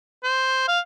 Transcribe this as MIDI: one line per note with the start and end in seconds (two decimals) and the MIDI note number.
0.24 0.67 72
0.68 0.80 77